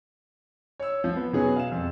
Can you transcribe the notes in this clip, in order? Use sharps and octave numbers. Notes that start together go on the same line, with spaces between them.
C#5 E6
F3
B3
B2 F#3 B3 C#4 G#4
F5 E7
F2